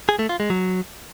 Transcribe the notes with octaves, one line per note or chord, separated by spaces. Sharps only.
G#4
A3
F4
G#3
F#3